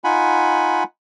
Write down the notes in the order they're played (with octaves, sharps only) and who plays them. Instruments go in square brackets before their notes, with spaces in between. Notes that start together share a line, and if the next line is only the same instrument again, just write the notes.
[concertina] D#4 F4 F#5 G#5 B5